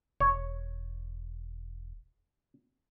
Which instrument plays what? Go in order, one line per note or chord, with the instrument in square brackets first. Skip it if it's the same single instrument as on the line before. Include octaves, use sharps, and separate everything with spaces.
[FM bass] E1 [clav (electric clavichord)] C#5